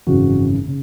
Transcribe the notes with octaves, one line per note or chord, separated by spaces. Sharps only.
G#1 F#2 C#3 E3 F#4
C#3